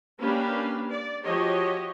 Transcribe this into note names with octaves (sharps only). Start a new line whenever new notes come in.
A#3 C#4 D4 G4 B4 F5
D5
F3 F#4 G4 C#5 D#5